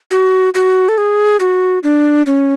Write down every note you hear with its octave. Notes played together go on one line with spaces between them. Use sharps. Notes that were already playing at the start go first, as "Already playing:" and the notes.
F#4
F#4
A4
G#4
F#4
D4
C#4